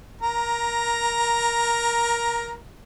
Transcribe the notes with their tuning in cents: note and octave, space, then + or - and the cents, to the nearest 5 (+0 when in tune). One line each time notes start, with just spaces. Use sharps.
A#4 +15 A#5 +0